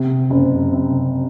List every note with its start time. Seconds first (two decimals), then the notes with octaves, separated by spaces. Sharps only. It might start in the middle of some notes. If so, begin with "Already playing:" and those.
Already playing: C3
0.30 F#1
0.73 C3